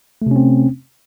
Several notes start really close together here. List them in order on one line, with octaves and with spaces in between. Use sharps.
A3 C3 C#4 C4